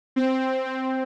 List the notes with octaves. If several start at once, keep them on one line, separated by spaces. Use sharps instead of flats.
C4
C4